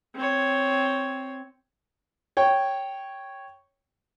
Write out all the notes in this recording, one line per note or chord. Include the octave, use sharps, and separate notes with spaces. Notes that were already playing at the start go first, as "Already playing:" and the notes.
C4 C#5
C#5 G5